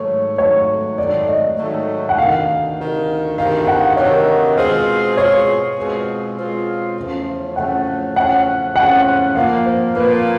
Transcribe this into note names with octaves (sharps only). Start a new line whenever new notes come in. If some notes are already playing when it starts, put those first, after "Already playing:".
Already playing: G#2 D#3 F#3 A3 C#5
G#2 D#3 F#3 A3 C#5
G#2 D#3 F#3 A3 D5
D#5
G#2 D#3 F#3 A3
F#5
D2 C3 D#3 F5
D2 C3 D#3
D2 C3 D#3 F5
F5
F#5
D2 C3 D#3 C#5
B2 G#3 C4 F4 G#4 C5
B2 G#3 C4 F4 G#4 C#5
B2 G#3 C4 F4 G#4
B2 G#3 C4 F4 G#4
E2 C#3 F3 A3 C#4
E2 C#3 F3 A3 C#4 F#5
E2 C#3 F3 A3 C#4 F#5
E2 C#3 F3 A3 C#4 F#5
A#2 F3 A#3 F5
C5
A#2 F3 A#3 B4